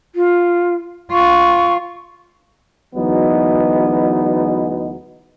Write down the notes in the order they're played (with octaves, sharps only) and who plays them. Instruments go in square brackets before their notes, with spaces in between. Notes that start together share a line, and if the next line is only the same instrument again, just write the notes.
[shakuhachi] F4
[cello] F4 [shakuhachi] C#6
[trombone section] D2 E3 F#3 G#3 B3 D#4